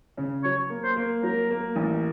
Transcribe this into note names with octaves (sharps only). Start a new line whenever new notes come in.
C#3
F#3 C#5
A#3
C5
A#3
F#3 A#4
A#3
A1